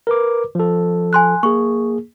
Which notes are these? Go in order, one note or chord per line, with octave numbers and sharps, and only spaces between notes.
A#4 B4 D6
F3 A4
G#5 C6 F#6
A#3 G#4 C#6